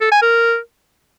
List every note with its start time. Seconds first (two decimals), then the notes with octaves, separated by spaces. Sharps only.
0.01 A4
0.11 G#5
0.22 A#4